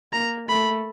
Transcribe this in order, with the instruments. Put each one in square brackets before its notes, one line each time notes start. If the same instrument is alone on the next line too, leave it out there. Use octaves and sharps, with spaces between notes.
[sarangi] A#3 [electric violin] A#5
[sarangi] A3 [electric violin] B5